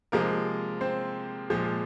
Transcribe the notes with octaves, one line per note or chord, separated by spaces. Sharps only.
C3 F3 G#3 A#3 A#4
C4 C5
A#2 F3 G#3